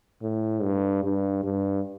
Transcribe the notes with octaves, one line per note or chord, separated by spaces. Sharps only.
A2
G2
G2
G2